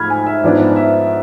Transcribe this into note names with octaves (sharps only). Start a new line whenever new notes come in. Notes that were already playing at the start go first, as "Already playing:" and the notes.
Already playing: G#2 F3 A3 B5 F6 G#6
G#5
E5
G#2 F3 B3 D4
E5